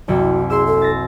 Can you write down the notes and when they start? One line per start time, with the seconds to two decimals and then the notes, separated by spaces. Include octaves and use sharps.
0.08 F#1 C2 F#4
0.50 G#4 C6 E6
0.67 A4
0.82 A6 A#6